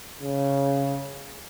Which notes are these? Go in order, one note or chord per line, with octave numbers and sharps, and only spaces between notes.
C#3